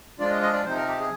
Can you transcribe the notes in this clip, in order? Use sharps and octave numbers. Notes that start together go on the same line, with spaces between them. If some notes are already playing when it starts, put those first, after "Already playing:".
F3 G#3 D4 F4 D5
D#5
D#5
D5
C3 F3 C4 D#4 C5
A#4
G4
G#4